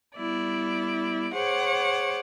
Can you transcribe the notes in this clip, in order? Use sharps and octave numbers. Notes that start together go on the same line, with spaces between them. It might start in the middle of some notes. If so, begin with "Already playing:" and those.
G3 B3 E4 D5
G#4 C5 C#5 F#5 D6